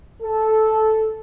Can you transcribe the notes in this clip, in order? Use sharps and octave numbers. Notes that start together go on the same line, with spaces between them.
A4